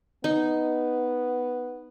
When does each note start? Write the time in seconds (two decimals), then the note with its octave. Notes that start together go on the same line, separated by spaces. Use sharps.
0.24 B3 D#4